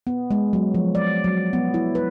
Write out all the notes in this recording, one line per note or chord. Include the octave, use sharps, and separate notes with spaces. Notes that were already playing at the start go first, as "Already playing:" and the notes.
B3
G#3
F#3
F3
D5
F#3
B3
E4
B4